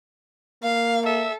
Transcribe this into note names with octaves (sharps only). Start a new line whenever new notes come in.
A#3 F5
A4 E5